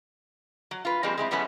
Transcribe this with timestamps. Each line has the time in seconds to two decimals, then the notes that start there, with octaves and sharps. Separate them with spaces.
0.71 F#3
0.85 F4 B4
1.03 F3 G3 G#3 A#3 C4
1.18 G#3 C4 E4
1.31 E3 G3 B3 C#4 E4 A4